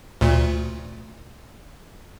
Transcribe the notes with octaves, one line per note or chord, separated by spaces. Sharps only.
D2 A#2